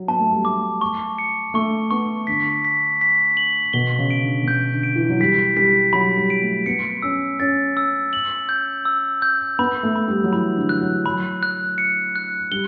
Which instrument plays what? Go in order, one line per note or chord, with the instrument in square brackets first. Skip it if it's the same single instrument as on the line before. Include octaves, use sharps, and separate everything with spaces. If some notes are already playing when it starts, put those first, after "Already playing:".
Already playing: [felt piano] F#3
[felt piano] B3 [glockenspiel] A5
[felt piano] A3
G3
[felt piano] A3 [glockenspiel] D6
[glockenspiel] C#6
C#7
[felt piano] A3 [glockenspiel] C#6
[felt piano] B3 [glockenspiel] C#6
[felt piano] D3 [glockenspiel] B6
[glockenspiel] B6
B6
F#7
[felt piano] B2 [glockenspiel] G7
[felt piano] C#3
[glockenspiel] D7
[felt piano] D3
B2
[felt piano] C#3 [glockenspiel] G6
[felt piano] D3
[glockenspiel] D7
[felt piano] E3
F#3
[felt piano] G3 [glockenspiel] B6
[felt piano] G3 [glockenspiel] B6
[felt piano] F#3 [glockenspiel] B5
[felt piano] G3
[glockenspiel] D7
[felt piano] A3
[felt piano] B3 [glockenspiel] C#7
[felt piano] C#4 [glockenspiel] E6
[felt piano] C#4 [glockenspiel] A6
[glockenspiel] E6
F#7
G6
E6
G6
[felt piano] B3 [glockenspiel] B5
[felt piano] A3
[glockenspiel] B5
[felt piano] G3
F#3
[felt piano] E3 [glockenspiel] B5
[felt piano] D3
[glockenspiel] F#6
[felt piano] F#3
[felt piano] F#3 [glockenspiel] B5
[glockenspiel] F#6
C#7
F#6
[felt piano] G3 [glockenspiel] G7